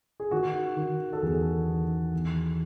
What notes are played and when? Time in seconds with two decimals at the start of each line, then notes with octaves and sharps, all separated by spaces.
0.20 G#4
0.31 D#3 F#4
0.77 D#3
1.13 A4
1.23 E2 G#4
1.68 D#3
2.14 E2